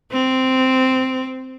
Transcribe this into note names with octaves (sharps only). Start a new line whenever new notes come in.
C4